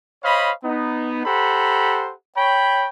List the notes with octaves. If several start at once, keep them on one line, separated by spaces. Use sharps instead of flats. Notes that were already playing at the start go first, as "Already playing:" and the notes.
C5 C#5 D#5 F5 B5
B3 D#4
G4 A4 C5 F#5 A#5 B5
C#5 G5 B5